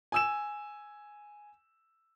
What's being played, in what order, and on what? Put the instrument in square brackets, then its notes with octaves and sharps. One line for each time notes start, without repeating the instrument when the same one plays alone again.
[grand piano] G#5 E6 E7